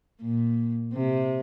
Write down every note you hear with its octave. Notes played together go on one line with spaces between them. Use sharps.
A#2
C3